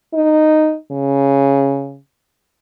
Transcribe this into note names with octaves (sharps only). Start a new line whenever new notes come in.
D#4
C#3